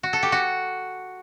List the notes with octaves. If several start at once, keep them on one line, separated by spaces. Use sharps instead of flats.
F#4
A4
G4
F#4